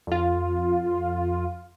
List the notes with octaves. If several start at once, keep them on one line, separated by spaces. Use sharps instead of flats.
F2 F4